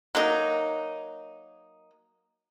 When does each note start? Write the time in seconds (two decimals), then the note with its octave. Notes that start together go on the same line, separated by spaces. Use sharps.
0.15 F#3 A#3 D#4